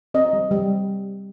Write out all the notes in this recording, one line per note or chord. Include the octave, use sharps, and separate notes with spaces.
C4 D#5
G3
G3